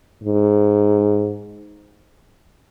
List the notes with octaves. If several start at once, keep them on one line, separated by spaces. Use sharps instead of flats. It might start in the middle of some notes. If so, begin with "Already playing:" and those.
G#2